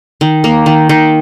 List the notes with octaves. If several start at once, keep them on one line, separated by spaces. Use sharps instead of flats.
D#3
A#3
D#3
D#3